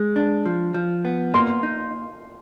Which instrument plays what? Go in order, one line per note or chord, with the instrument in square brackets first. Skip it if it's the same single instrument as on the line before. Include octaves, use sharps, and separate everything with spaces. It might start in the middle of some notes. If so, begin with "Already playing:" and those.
Already playing: [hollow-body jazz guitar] G#3
D4
F3
F3
B3
[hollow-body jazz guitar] A#3 [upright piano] C6
[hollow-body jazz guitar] D#4